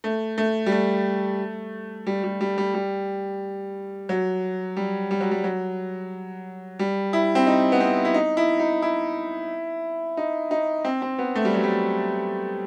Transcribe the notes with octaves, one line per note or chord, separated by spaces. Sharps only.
A3
A3
G3
A3
G3
G3
G3
G3
G3
F#3
G3
G3
F#3
G3
F#3
G3
E4
C4
D#4
B3
C4
E4
D#4
E4
D#4
E4
D#4
D#4
C4
C4
B3
A3
G3
F#3
G3